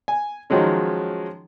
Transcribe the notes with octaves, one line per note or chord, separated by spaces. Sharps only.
G#5
D#3 F3 F#3 G#3 C#4